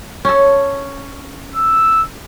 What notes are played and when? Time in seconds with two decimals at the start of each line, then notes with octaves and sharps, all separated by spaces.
0.25 C#4 A4
1.55 E6